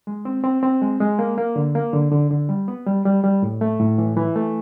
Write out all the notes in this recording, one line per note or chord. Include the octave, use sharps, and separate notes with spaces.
G#3
C4
C4
C4
G#3
G#3
A#3
A#3
D3
A#3
D3
D3
D3
G3
B3
G3
G3
G3
A2
A3
A2
E3
E3
A3